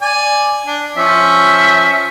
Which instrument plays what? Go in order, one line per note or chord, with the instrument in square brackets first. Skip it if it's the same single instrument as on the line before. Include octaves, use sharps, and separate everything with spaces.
[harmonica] D5 G#5
D4
[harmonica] F3 C#4 [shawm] E5